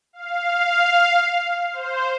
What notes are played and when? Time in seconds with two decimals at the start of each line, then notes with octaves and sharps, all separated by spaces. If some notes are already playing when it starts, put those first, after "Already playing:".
0.13 F5
1.73 C5